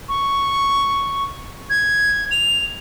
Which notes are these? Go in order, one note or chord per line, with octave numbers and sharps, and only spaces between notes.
C#6
G#6
F7